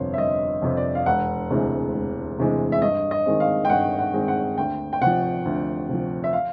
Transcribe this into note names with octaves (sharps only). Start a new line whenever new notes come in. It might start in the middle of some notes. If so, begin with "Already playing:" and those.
Already playing: G1 F2 C3 C5 C#5
E5
G1 D#5
F2 C3
D5
F5
E1 F#5
D2 C3 E3 G#3
E1
D2 C3 E3 G#3
E5
G2 D#5
D#5
D#3 G#3 C4
F5
G5
G2 F#5
F#5
D#3 G#3 C4
F#5
D2 G5
G5
C3 F3 F#5
D2
C3 F3
E5
F5